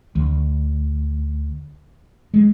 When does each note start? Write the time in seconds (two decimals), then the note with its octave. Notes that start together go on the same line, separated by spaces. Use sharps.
0.15 D2
2.34 G#3